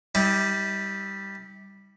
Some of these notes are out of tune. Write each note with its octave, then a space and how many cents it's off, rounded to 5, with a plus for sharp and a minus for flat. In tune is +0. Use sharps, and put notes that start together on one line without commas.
G3 +0 E4 -45